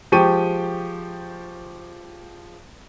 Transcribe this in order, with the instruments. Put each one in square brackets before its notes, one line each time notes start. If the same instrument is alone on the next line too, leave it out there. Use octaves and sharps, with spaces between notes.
[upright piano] F3 G#3 G4 G5 C#6 D#7